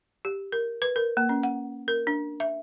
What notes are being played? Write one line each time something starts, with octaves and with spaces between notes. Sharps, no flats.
G4
A#4
B4
A#4
A#3
C#4
F#5
A#4
D4
E5